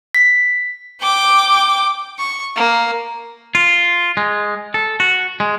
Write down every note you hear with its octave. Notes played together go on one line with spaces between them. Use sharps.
B6
G5 D6
C#6
A#3
F4
G#3
A4
F#4
G#3